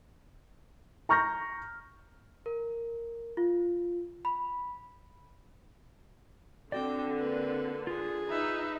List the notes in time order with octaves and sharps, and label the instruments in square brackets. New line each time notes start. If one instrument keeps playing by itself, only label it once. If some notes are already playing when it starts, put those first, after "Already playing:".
[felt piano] A#5 C#6 F6 G6 A#6
[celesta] A#4
F4
B5
[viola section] D3 [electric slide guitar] C4 F#4 D5 [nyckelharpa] G5 D6
[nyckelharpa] A#3 B4
[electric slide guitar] F4 [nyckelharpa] G#4
[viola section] D#4 [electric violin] B4 E5